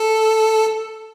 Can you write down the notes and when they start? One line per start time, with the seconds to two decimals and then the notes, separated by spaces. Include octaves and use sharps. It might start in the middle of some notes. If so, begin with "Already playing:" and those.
Already playing: A4